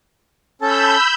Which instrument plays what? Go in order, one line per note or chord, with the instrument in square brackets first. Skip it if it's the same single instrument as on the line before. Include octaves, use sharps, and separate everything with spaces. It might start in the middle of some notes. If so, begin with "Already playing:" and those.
[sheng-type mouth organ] C#4 A4 A5 [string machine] B5 E6 G6